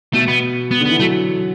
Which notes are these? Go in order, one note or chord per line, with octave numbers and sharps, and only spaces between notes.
B2 A3
B3
B3
D3
B3
E3
F#3 A3